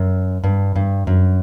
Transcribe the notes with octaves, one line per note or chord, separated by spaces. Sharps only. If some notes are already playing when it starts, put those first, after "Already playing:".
Already playing: F#2
G2
G2
F#2